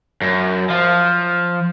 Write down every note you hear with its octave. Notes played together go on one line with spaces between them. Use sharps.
F#2
F3